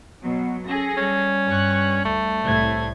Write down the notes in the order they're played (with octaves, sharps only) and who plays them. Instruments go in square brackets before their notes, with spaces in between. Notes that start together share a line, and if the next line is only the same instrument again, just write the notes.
[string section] B2 F#3 [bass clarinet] B3
[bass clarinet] C#4 [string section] G#4 A4 A#6
[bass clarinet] G3 [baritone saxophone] C#4
[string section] G2 C#6 F#6
[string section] D2 [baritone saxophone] A3
[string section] C2 A2 G#6 [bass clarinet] G3